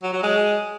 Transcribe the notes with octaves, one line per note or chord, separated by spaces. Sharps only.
F#3
F#3
G#3